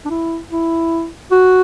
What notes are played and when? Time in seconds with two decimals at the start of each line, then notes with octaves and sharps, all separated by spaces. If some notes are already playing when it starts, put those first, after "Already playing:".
0.05 D4
0.10 E4
0.51 E4
1.31 F#4